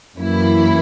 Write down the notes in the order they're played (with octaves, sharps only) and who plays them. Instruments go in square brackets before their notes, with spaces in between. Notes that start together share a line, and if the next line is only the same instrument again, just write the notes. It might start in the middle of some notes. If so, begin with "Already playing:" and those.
[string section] F#2 E3 A#3 E4